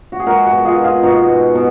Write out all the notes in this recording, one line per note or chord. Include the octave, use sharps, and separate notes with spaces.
F#4
G#4
G#3 F#4 A#4
F#4 A#4
B2
F4 G#4
D#4
F4 G#4
B2 D#4 F#4
G#3
B2